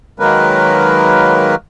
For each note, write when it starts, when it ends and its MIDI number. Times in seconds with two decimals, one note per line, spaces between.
0.20 1.55 51
0.20 1.55 54
0.20 1.55 56
0.20 1.55 58
0.20 1.55 70
0.20 1.55 71